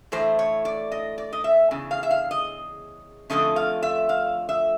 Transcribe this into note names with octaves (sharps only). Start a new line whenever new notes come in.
A2 E3 A3 C5
C#5
D5
D#5
D5
D#5
E5
E2 C#3
F5
E5
F5
D#5
F2 D3 F3 A3 C#4 D#5
F5
E5
F5
E5